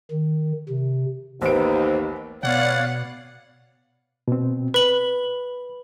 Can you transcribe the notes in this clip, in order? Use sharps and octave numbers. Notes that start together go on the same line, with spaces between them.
D#3
C3
A1 D#2 B3 C5 D7
B2 B3 C#5 D5 F5 F#5
B2 C4
B4 B5 F#7